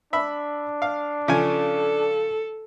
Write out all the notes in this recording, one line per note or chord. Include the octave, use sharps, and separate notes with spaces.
D4 E5 B5
F5
C#3 F3 A4 G#5